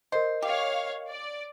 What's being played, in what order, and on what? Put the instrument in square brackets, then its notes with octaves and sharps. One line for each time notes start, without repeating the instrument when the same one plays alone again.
[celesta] A#4 D#5 [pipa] C5
[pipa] G4 [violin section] C#5 F5
[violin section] D5